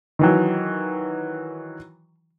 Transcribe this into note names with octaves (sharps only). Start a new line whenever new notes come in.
D#3 E3 F#3